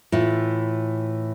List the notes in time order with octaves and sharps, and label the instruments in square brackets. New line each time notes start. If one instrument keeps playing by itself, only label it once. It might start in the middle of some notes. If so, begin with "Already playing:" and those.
[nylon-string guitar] A2 E3 F4